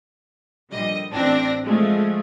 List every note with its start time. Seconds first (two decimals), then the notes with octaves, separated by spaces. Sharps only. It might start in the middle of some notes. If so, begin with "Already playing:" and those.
0.72 A#1 D3 G3 D#5
1.11 A1 C4 D4 A#6
1.64 F3 G#3 A3